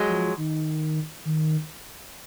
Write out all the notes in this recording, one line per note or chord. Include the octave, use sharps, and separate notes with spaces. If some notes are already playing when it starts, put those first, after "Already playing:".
Already playing: F#3 G#3
F3
D#3
D#3